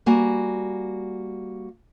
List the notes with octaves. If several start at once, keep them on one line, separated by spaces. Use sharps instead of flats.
G3 A#3 F#4 G#5